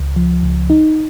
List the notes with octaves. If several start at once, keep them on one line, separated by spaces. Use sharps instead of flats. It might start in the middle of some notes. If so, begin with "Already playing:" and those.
Already playing: C#2
F3
C#2
D#4